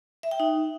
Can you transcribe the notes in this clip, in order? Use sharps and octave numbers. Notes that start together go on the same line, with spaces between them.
E5
G5
D#4